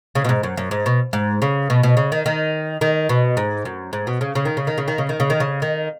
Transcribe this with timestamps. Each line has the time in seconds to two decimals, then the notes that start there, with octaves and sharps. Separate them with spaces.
0.15 C#3
0.25 B2
0.29 G#2
0.43 F#2
0.57 F#2
0.71 G#2
0.86 B2
1.13 G#2
1.42 C#3
1.70 B2
1.83 B2
1.97 C#3
2.12 D#3
2.26 D#3
2.81 D#3
3.09 B2
3.37 G#2
3.65 F#2
3.93 G#2
4.07 B2
4.21 C#3
4.35 C#3
4.45 D#3
4.57 C#3
4.67 D#3
4.78 C#3
4.88 D#3
4.98 C#3
5.09 D#3
5.20 C#3
5.30 D#3
5.40 C#3
5.62 D#3